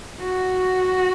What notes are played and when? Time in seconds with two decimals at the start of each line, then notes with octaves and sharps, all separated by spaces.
0.19 F#4